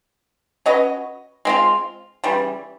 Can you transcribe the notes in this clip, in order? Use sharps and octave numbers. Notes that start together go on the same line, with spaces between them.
C#4 F#4 B4 D#5
G#3 C4 F4
C#3 E3 G3